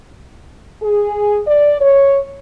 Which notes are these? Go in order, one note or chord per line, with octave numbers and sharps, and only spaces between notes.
G#4
D5
C#5